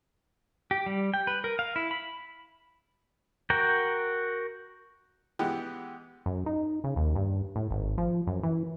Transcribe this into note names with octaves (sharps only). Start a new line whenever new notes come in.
G4
G3
G5
B4
A#4
F5
E4
B5
F#4 A#4 G5
E3 G#3 B3 G4
F#2
D#4
C#3
D#2
G2
A2
G#1
F3
F#2
E3